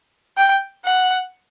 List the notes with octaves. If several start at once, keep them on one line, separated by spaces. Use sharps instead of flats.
G5
F#5